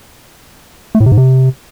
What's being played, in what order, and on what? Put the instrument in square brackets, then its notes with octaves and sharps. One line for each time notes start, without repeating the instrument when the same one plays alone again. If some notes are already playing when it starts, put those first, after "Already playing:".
[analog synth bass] A3
A2
C3
G#2
C3